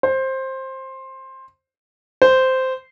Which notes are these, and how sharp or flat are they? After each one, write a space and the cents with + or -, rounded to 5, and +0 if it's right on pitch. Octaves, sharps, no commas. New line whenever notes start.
C5 +15
C5 -10